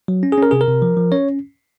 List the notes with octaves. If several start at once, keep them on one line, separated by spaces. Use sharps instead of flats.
F#3
C#4
G#4
C#4 A#4
C3 G#4
A#4
C3
F3
F3
C#4 C#5